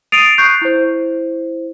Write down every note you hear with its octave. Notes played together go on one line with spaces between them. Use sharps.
D#6 A6 C7 D7 D#7 F7
C#6 F#6 G6 C7
E4 C5